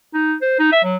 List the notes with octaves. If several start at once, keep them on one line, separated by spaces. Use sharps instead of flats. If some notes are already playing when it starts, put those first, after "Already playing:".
D#4
C5
D#4
E5
F#3